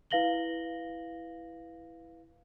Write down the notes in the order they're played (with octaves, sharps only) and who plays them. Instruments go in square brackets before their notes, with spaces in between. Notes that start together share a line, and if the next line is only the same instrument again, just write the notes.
[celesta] E4 B4 F5 A#6 F#7 G7